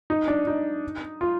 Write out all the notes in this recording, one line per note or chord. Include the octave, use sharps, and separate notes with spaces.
D#4
D4
D#4
F4